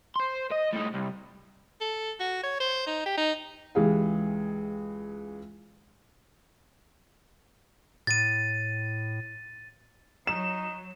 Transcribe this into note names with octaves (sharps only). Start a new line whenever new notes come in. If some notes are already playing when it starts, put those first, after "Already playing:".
C5 C6
D#5
A2 D#4
C2
A4
F#4
C#5
C5
D#4
G4
D#4
C#2 E3 G#3 G4 G#4 F5
A2 A6 D#7
F#3 D#4 E7